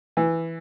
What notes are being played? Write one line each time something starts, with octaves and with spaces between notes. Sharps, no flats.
E3